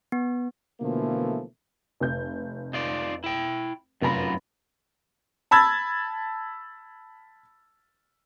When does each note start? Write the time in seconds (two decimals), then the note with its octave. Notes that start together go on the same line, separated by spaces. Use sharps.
0.12 B3
0.80 B2 D3 E3 F3 A3 A#3
2.00 F1 G6
2.73 D#4 F4 D5
3.24 E4 G5
4.01 F1 F#2 F4 A#4 B5
5.51 A5 B5 E6 G#6 A6